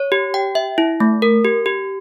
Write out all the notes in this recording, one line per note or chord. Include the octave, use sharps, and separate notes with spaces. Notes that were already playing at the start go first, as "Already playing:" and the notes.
Already playing: C#5
G4
G5
E5
E4
A3
A#4
G4
G4